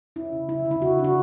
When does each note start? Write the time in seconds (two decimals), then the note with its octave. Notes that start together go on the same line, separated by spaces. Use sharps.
0.16 C#4 E4
0.33 C#3
0.49 C#4 E4
0.66 D3
0.71 E4
0.82 C#3 F#4
0.99 D4
1.04 F#4